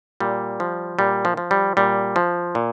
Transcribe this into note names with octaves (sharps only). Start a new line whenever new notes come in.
A#2 G3
F3
A#2 G3
F3
F3
G3
A#2 G3
F3
A#2